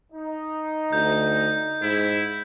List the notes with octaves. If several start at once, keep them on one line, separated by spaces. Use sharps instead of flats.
D#4
D2 G6
G#2 E4